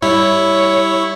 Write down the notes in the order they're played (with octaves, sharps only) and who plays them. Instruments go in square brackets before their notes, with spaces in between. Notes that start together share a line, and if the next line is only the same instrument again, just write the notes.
[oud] G3 [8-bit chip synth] E4 [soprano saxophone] C#5